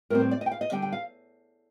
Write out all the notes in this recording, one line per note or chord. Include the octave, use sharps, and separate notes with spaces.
A2 G3 C4 A#4
C5
D5
D#5
G5
F5
D#5
D3 G3 D4 G5
G5
F5